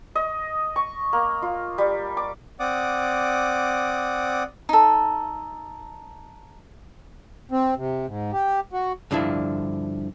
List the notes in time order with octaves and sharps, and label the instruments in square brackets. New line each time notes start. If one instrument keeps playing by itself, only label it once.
[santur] D#5
C#6
A#3
F4
G3
D6
[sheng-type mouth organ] C4 D5 F#5 D6 D#6
[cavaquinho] D#4 A4
[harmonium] C4
C3
G#2
G4
F#4
[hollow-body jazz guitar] G2 D3 F3 D4 E4